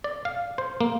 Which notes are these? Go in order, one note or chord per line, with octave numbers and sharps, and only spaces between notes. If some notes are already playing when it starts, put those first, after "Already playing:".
D5
F5
C5
A#3